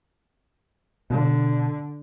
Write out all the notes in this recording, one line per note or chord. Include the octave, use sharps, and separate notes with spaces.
B2 D3